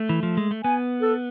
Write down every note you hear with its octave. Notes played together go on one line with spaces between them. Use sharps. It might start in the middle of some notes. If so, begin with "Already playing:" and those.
Already playing: A3
E3
F3
G#3
A3
B3 G#5
A4